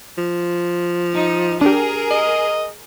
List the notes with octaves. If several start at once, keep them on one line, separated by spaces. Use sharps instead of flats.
F3
D#4
D4 G4 G#4 A#4
D#5